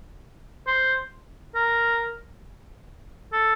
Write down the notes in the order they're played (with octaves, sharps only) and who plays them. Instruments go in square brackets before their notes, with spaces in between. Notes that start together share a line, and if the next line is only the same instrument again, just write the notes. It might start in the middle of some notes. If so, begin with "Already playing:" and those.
[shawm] C5
A#4
A4